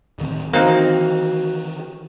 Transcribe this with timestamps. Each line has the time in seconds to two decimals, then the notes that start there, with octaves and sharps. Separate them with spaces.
0.19 D1 D#3 C4
0.53 D#3 E3 A#3 C4 D#4 F#4